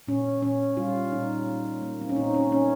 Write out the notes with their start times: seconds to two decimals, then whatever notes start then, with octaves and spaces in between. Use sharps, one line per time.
0.08 A#2 C#4
0.42 A#2 C#4
0.77 G3 F4
1.12 A#2 D#4
1.46 A#3
1.82 A#3
2.02 C4
2.09 C#4
2.16 A#2 D#4
2.34 C#4
2.51 A#3 C#4